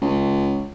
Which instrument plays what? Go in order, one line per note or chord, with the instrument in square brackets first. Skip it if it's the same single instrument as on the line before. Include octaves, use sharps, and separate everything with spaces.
[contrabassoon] C#2